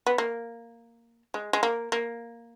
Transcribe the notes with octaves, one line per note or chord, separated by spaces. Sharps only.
B3
A#3
G#3
G#3
A#3
A#3